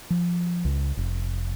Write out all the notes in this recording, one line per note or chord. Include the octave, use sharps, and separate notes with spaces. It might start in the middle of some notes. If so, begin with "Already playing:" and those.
F3
C#2
F1